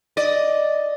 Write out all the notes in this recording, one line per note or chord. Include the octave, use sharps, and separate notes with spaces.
D5 D#5